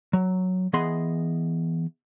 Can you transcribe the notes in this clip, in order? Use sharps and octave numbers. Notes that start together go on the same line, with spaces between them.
F#3
E3 B3 G#4 D#5 C6